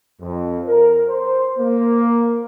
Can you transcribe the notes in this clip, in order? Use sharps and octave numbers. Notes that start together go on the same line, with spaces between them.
F2
A#4
C5
A#3